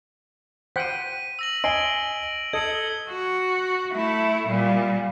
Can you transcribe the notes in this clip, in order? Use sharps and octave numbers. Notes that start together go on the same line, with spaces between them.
C5 F#5 G5 B6 D#7
E6 A#6 F#7
D#5 G#5 C6 D7 G7
A4 D#5 G#6 C#7 F#7
G7
F#4
A3 E4
A#2 G3